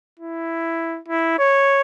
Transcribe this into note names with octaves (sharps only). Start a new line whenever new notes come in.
E4
E4
C#5